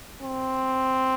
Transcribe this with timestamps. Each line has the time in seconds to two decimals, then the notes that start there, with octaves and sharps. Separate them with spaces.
0.22 C4